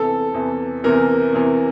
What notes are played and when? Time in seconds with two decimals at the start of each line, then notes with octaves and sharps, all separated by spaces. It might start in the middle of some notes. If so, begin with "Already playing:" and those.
Already playing: E2 C3 E3 A4
0.34 E2 C3 E3
0.84 E2 C3 E3 A#4
1.33 E2 C3 E3